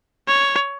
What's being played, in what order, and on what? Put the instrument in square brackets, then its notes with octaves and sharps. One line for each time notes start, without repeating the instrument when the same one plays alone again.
[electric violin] C#5